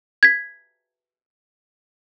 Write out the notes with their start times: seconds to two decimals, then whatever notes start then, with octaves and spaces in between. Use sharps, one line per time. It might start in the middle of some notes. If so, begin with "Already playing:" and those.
0.23 G#6 B6